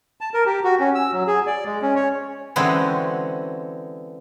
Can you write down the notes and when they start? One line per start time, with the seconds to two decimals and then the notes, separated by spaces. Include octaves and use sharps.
0.21 A5
0.34 A#4
0.46 G4
0.64 F#4
0.80 C#4
0.95 E6
1.13 F#3
1.27 G#4
1.47 D5
1.65 G#3
1.82 C#4
1.96 C#5
2.56 D3 E3 G#3 C4 C#4 F#4